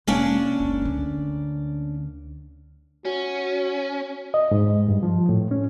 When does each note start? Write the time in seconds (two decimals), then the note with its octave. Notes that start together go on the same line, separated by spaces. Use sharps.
0.07 F1 A#3 C#4 D4
0.60 F#1 C#2
0.82 D2 D3
3.05 C#4 F#4
4.34 D#5
4.51 G#2
4.89 G2
5.03 F3
5.29 A2
5.51 C#4